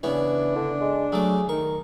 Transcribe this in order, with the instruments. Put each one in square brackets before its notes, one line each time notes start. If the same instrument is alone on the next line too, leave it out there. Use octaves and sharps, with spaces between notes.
[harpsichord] C#3 B3 C#5 [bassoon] E3 [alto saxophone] D4
[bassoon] D3
G#3
[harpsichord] F#3 A3 D6 [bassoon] G#4
[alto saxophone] D#3 [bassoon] A#4 [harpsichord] C#6